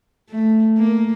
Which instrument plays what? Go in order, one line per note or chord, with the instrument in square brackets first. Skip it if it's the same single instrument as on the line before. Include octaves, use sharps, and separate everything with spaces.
[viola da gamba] A3
A#3